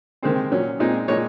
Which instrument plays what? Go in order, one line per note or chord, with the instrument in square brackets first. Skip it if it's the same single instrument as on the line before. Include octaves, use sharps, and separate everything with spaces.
[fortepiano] C3 D#3 G#3 C4 C5
A#2 F#3 C#4
A#2 G#3 C4 D#4
A#2 G#3 D#4 C#5